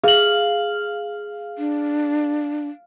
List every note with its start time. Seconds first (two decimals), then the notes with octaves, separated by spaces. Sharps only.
0.04 G#4 F5 F#7
1.58 D4